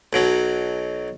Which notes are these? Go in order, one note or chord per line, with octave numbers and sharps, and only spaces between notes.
B1 B2 F#3